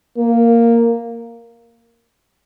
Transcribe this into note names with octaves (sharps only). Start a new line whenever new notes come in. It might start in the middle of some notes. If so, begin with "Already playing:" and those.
A#3